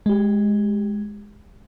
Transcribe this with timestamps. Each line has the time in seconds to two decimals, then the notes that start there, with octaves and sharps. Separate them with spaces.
0.06 G#3 G4